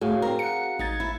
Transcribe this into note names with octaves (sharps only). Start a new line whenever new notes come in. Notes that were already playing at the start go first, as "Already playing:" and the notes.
A2 F#4 G#4 F5
C4 A#4
F#5 C#7
A1 D#4 G#6 A6
E4